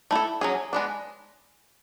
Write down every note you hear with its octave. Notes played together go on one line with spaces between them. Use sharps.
A3 E4 A4
F#3 C#4 G#4
G#3 B3 D4